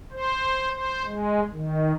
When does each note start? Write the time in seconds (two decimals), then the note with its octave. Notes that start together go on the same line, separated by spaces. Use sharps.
0.13 C5
0.71 C5
1.05 G#3
1.52 D#3